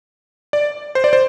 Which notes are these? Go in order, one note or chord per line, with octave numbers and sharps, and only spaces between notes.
D5
C5
D5
C5